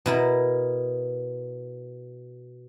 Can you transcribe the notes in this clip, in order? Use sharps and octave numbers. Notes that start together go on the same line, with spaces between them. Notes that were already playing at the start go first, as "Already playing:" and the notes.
B2 E4 A#4